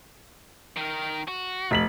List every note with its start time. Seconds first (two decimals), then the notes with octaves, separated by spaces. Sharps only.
0.77 D#3 A#4
1.28 F#4
1.71 F1 B6 F#7